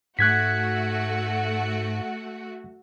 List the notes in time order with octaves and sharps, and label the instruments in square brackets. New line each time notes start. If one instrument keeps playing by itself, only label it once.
[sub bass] G#2 [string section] A3 F#4 [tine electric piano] F#6 G#6 B6